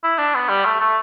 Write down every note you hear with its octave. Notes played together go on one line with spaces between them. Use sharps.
E4
D4
B3
G3
A3
A3